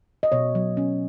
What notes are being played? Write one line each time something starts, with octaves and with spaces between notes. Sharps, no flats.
D#5
B2 C#5
F#3
C#4